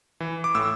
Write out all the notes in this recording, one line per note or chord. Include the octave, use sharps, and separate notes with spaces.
E3
D6
A2 E6